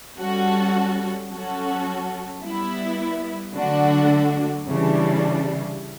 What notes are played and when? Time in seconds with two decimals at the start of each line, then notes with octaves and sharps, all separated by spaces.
0.18 G3 C#4 F#4 A4
1.31 F#3 C#4 F#4 A4
2.43 G3 B3 E4
3.54 D3 F#3 A3 D4 F#4
4.67 C#3 E3 G3 D4